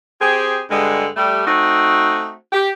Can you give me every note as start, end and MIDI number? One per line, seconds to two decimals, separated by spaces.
0.22 0.61 60
0.22 0.61 67
0.22 0.61 68
0.70 1.08 43
0.70 1.08 50
0.70 1.08 56
1.17 1.45 55
1.17 1.45 57
1.47 2.34 57
1.47 2.34 60
1.47 2.34 63
1.47 2.34 66
2.53 2.69 67